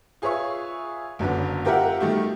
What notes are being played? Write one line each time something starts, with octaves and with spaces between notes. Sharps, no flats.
F4 G#4 B4 C#5 E5 C#6
F#1 F#2 D3 B4
F4 G4 A#4 E5 F#5
B2 D#3 G3 A3